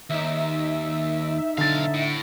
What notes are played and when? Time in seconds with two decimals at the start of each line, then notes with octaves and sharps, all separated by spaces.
0.10 D#2 D#4 E5
1.58 B1 D3 F5 A6
1.94 A2